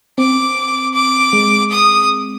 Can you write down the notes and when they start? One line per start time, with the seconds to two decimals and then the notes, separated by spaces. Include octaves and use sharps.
0.18 C4 D6
0.94 D6
1.33 G#3
1.72 D#6